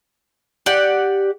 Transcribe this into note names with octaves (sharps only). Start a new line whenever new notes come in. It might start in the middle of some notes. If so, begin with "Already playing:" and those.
G4 D5 F#5